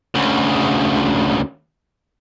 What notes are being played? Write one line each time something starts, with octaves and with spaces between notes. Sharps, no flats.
D2 C#3